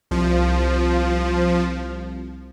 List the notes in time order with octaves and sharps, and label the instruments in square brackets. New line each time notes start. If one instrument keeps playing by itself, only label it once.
[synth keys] C2 [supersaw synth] F3